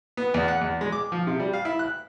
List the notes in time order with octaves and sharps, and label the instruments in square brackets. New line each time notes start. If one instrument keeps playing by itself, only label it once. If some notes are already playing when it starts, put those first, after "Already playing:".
[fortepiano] B3
E2
F#5
E2
G#3
D6
F3
C3
G3
F5
E4
F#6